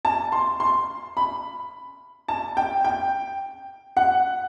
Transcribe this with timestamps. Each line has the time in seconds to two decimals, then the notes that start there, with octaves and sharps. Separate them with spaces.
0.05 A5
0.32 C6
0.60 C6
1.17 B5
2.29 A5
2.57 G5
2.85 G5
3.97 F#5